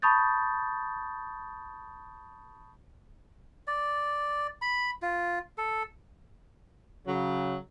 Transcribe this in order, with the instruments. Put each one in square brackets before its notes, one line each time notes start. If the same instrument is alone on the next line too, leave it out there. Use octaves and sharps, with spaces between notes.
[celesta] A5 B5 C#6 D#6 G6 A6
[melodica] D5
B5
F4
A4
[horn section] C#3 F#3